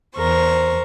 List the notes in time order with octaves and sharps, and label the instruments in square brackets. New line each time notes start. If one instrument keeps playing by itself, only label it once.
[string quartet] E2 A#4 C5 C#6